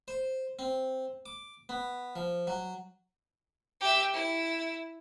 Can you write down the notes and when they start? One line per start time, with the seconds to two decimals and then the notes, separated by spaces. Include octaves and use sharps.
0.08 C5
0.59 C4
1.26 D6
1.69 B3
2.16 F3
2.47 F#3
3.81 G4 E5
4.14 E4